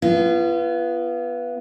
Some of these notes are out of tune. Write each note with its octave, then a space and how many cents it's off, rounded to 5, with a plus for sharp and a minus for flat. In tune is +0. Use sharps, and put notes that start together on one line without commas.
B3 -5 F4 -35